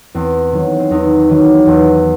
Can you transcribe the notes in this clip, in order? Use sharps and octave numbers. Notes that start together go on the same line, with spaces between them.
E2 C4
D#3 F#3
C4
E2 D#4
D#3 F#3
E2